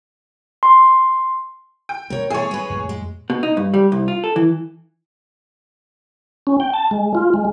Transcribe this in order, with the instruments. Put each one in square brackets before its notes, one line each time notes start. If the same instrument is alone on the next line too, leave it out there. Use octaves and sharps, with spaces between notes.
[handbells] C6
[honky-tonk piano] G5
[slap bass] B2 A3 [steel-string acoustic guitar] A#4 C#5
[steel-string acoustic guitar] E3 A3 [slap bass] B3 [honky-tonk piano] G#4 C#5
[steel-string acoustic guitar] G#3 B4
[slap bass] F2 A2
[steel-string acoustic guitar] G#3
[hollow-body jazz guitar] B2
D#4
G2
G3
C2
F4
A4
E3
[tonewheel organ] C#4
G5
A5
G#3
F4
G#3